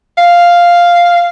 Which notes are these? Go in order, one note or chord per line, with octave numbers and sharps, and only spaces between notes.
F5